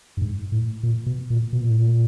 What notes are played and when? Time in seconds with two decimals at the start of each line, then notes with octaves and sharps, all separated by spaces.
0.17 G2
0.22 G#2
0.52 A2
0.83 A#2
1.06 B2
1.30 A#2
1.53 B2
1.61 A#2
1.71 A2
1.79 A#2